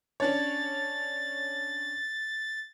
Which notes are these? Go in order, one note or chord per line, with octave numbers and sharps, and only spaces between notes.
C#4 D4 C#5 A6